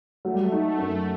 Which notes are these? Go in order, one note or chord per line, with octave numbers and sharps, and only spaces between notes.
F#3 A3
G3
A3
D#4
F#2